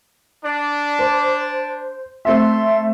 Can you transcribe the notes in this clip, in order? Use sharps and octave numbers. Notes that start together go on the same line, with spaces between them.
D4
C5
A3 C4 A4 E5 C6